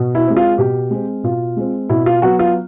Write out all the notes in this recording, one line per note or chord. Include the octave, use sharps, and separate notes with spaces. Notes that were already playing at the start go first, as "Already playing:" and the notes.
Already playing: B2
E4
G#3 C4
F4
B2 G4
G#3 C4
B2 F4
G#3 C4
B2 E4
F4
F#3 B3 F#4
F4